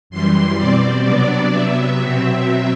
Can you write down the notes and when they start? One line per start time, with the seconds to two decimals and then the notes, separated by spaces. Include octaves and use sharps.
0.10 F#2 E3 G3 C6
0.58 B2 G3 C4 D5
1.05 C3 F#3 B3 D4
1.53 C3 F#3 B3 E5
2.00 B2 F#3 C4 E5